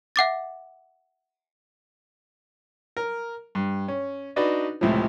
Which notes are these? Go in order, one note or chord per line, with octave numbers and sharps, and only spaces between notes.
E5 F#5 D6 A6
A#4
G2
C#4
D4 D#4 F#4 B4 D5
C#2 A2 C3 F3